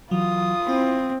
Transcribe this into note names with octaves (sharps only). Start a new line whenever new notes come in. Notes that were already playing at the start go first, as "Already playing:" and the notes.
E3 F#3 F4 D#6
C4 E4 B5